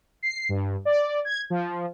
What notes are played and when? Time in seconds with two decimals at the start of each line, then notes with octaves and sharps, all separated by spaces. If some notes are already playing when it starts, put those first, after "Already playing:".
0.23 C7
0.49 G2
0.85 D5
1.25 G#6
1.50 F3